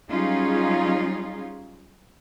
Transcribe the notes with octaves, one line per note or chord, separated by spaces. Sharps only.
F#3 G3 C#4 D#4 F4 G#4